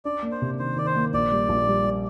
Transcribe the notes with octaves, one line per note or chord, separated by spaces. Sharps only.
D4 D5
A#3
C5
C3
D#3 C5
D#3 D5
C5
A#3
A#1 D5
G3
A#1
G3
G3